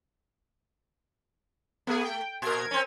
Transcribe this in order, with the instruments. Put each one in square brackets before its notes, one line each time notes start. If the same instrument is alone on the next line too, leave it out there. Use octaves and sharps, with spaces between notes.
[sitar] A3 [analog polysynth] B3 G#4
[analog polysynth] G5
[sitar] A#2 [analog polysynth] A#4 G#6
[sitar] C4 C#4